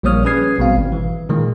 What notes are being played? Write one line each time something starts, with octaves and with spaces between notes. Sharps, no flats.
A#1 G3 A#3 C#5 D#6 F6
C#4 G#4 B4 D#6 G#6 C7
A#1 B2 G3 C4 F5
G#1
E3
A#2 D#3 G#3